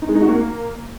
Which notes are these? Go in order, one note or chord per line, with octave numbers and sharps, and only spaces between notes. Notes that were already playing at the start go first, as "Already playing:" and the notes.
D#4
G#3
D#4
F#4
A#3